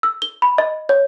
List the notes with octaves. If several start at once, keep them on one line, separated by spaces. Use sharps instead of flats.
E6
G7
B5
D#5
C#5